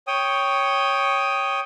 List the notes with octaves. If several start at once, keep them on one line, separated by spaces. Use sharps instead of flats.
C#5 G5 D#6